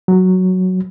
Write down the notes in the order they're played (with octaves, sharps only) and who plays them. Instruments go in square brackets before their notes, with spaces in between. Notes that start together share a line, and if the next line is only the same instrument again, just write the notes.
[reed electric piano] F#3